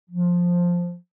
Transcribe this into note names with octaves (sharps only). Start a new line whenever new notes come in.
F3